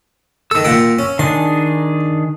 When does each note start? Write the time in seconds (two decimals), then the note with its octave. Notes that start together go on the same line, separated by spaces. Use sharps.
0.51 D#3 A4 E6
0.64 A#2 F#5 G5
0.99 C#4
1.19 D#3 D4 G#4 C6